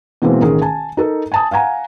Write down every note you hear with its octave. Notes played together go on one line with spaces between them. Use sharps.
B2 E3 G#3 A#3 C4
A1 D#3 G#4 A#4
G#5 A5
D#4 A4 A#4
G#5 A5 D#6
F5 F#5 G#5 A#5